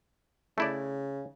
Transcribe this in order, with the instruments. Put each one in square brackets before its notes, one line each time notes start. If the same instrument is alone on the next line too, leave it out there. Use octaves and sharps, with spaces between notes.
[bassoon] C#3 [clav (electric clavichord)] A3 E4 D5